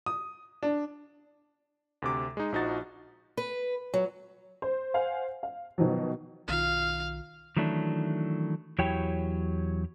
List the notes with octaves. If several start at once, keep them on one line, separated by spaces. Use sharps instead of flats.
D#6
D4
D2 C3 D6
G#3 D#4
A#1 F3 D#4 F#4 A6
B4
F#3
C5
C5 F5 F#5 G#5
F5
B2 D#3 F3 F#3
B1 D#3 F4 F5
D#3 E3 F#3 A3 D4
E2 F#3 E4 G4 C#5 G5